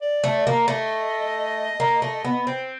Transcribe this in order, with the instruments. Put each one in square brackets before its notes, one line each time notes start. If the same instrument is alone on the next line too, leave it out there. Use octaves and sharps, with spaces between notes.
[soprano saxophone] D5
[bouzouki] A3
[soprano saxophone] D5
[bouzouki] A#3 [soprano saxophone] D#5
[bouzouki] A3
A#3
A3
B3
C4